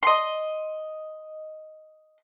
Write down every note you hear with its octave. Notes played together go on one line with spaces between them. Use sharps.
D#5 C6